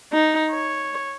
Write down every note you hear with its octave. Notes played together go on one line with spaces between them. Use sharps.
D#4
C#5